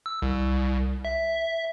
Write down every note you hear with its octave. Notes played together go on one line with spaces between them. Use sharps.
E6
C2
E5